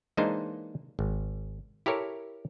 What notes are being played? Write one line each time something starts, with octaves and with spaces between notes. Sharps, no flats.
E3 G#3 A#3 D4 D#4 C5
G#1
E4 G4 A4 A#4 C#5